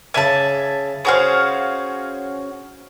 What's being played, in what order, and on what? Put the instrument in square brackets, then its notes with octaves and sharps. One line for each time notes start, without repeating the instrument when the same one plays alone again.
[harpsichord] C#3 E5 D6 [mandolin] G#5 A5
[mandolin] C#4 F#4 F5 [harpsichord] G#4 C5